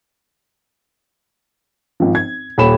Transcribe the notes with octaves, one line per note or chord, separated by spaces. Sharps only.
G#1 F3
G#6
D#1 C#5 B5 E7